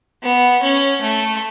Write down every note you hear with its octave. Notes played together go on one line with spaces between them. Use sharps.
B3
C#4
A3